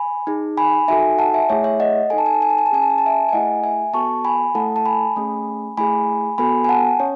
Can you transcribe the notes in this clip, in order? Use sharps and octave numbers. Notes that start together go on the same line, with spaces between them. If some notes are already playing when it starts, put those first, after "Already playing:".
Already playing: G#5 B5
D#4 G#4
G#5 B5
D#4 F#4 A4 E5 G#5
F#5 A5
E5 G#5
A3 E4 G#4 C#5 E5
C#5 E5
D#5 F#5
D#4 A4 G#5
A5
G#5
A5
G#5
A5
G#5
A5
C#4 G#4 G#5
A5
G#5
A5
E5 G#5
G#5
A3 E4 G#4 D#5 F#5
E5 G#5
B3 F#4 A4 A5 C#6
G#5 B5
A3 E4 A4 F#5 A5
A5
G#5 B5
A3 C#4 G#4
A3 E4 G#4 G#5 B5
B3 F#4 A4 G#5 B5
G#5
F#5 A5
C#4 C#5